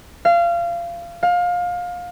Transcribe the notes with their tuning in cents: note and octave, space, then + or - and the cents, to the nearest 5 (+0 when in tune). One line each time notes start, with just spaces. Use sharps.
F5 -25
F5 +25